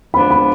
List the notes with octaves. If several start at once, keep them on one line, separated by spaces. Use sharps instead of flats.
D3 F3 G#3 B3 D4 B5
B5